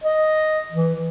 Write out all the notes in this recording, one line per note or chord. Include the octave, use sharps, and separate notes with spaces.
D#5
E3